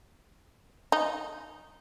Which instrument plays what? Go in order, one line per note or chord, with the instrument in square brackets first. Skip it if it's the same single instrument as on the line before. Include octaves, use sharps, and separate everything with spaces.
[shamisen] D#4